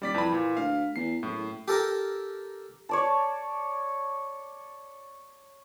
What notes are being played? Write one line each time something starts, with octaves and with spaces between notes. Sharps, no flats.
D#1 G3 D5 B6
F2 E3 B5
A#2
D2 F5
E2 C7
F#1 A2
G4 A4 A#4
C#5 D5 A5